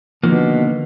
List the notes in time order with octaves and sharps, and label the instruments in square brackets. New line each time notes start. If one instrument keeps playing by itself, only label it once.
[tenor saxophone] B2 [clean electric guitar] D3 D#3 A#3 [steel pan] F3